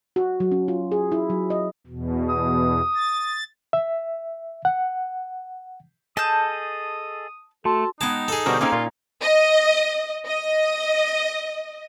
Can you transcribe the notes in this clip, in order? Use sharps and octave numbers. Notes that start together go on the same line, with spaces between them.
F#4
F#3
C#4
F4
G#4
E4
F#3
D#5
E2 B2
D#6
A6
E5
F#5
G#4 A4 D#5 A5 D#6 G6
A3 F#4 A4 A5 C6
G#3 B3 D#4 G5 A5
G#4 A4
B2 D3 G3 F#4 A#4 C5
A#3 C4 C#4 D#4
A#2 F4
D#5
D#5